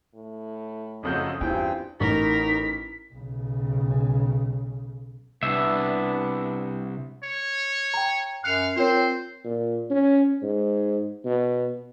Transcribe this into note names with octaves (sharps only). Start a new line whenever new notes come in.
A2
F#1 F2 F#3 D#5 G6
E2 G2 C4 E4 F4 G5
A1 D#4 A#4 B6
B1 C#3
C2 B3 D4 E5
C#5
G5 A#5
F#2 F5 F#6 C#7 F7
C4 F4 A#4 C5 C#5
A#2
C#4
G#2
B2